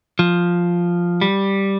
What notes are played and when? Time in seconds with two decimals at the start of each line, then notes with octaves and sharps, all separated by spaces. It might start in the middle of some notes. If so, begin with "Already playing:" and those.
0.19 F3
1.21 G3